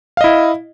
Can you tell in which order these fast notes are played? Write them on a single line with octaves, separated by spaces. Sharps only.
F5 D#5 E4